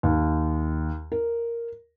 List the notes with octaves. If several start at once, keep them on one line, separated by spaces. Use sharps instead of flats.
D#2
A#4